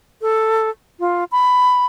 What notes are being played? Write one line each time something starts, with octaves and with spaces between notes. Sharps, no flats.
A4
F4
B5